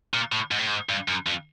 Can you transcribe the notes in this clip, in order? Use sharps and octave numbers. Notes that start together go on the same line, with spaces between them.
A#2
A2
G#2
A2
G#2
G2
F#2
F2